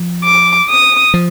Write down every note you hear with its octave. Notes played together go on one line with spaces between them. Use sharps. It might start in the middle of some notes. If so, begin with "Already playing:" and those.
Already playing: F3
D6
D#6
F3